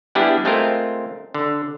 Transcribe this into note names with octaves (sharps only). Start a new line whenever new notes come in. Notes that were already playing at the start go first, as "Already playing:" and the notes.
G3 B3 D4 E4 G4 G#4
G#3 A3 C4 F4 A#4
D3